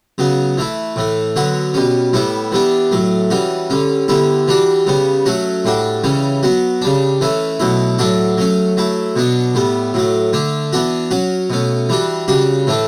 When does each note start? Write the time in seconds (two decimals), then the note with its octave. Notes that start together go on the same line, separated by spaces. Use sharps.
0.18 C#3 F#3 B3
0.58 E3 A3 E4
0.96 A2 E3 A3
1.36 D3 F#3 B3 F#4
1.74 B2 G3 C#4
2.13 A2 G3 B3 E4
2.52 E3 G3 B3 D4
2.92 A2 F#3 A3
3.30 E3 G3 C#4 F#4
3.70 D3 G3 C#4
4.08 D3 G3 B3 E4
4.48 E3 G3 D4 F#4
4.87 C#3 G3 B3
5.26 F#3 A3 C#4 F#4
5.65 A2 G3 D4 F#4
6.04 C#3 E3 G3 C#4
6.43 F#3 B3 F#4
6.82 C#3 G3 D4
7.21 E3 A3 C#4 E4
7.60 B2 F#3 A3 E4
7.99 A2 F#3 A3 D4 F#4
8.38 F#3 A3 C#4
8.77 F#3 A3 E4
9.16 B2 F#3 B3 D4
9.55 A2 G3 B3
9.94 A2 F#3 A3
10.33 D3 A3 D4
10.73 E3 B3 D4 F#4
11.11 F#3 C#4 F#4
11.50 B2 A3 C#4
11.89 E3 G3 D4 F#4
12.28 C#3 G3 D4 F#4
12.67 A2 E3 A3 D4